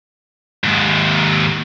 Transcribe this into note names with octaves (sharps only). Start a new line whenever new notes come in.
D#2 G#2